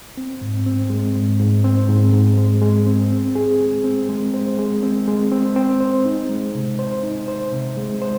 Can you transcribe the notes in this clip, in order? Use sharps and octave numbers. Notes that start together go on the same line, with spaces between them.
C4
G#2
C4
G#3
G#2
G#2
C4
G#2
G#2
G#3
G#3
C4
C4
G#4
G#3
C4
G#3
C5
G#3
C4
G#3
C4
C4
C5
D#4
G#3
C3
C5
D#4
C5
C3
G#3
C5